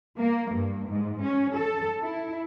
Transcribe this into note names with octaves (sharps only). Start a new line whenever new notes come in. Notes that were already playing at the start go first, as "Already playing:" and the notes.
A#3
G2
G#2
C#4
A4
E4